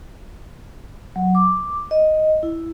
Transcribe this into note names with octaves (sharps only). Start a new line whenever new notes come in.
F#3
D6
D#5
E4